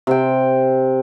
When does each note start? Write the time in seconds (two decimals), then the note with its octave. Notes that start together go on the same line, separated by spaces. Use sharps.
0.07 C3 G5